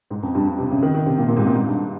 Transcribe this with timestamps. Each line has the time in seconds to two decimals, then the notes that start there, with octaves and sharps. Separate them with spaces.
0.10 G#2
0.23 F2
0.35 G2
0.47 G2
0.58 C3
0.71 C#3
0.83 D#3
0.94 D#3
1.06 C3
1.18 A#2
1.29 A#2
1.37 G#2
1.46 A#2
1.55 G#2
1.66 G2